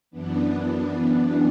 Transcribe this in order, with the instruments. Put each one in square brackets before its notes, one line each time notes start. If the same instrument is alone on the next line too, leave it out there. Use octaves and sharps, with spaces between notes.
[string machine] F#2 E3 B3 D4